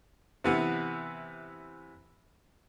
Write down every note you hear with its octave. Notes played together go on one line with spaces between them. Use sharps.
C3 E3 B3